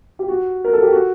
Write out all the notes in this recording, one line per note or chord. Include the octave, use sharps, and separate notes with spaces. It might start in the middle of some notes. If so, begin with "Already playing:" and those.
G4
F#4
A#4
A4
G4
F#4